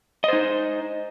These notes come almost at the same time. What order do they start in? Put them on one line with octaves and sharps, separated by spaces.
D#5 C5 D#4